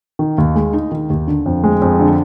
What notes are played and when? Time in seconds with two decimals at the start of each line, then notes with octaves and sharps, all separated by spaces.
0.19 D#3
0.38 D#2
0.55 G#3
0.73 D#4
0.91 D#3
1.10 D#2
1.28 D3
1.46 F2
1.64 G#3
1.82 F2
2.00 D3